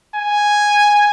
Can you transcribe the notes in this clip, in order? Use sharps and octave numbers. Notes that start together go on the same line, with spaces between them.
G#5